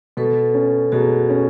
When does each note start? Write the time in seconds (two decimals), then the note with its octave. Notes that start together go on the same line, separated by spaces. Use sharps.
0.17 B2 A4 B4
0.54 C#4
0.92 B2 F#4 G#4
1.29 C#4